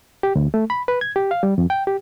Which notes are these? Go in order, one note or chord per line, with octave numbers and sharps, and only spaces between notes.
G4
D2
A3
B5
B4
G#6
G4
F5
G3
F2
G5
G4